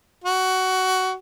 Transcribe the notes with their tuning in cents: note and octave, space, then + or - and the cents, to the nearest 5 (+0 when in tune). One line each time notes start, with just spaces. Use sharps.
F#4 +15